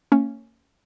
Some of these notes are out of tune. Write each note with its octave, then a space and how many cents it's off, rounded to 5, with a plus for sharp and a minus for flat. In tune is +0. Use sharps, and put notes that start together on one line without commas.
A#3 -35 C#4 +0